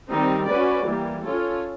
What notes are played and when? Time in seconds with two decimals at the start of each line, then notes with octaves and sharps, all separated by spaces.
0.11 D#3 G3 C4 D#4
0.48 C#4 F#4 B4 D5
0.86 E3 G3 A#3
1.24 C#4 F4 A4 C#5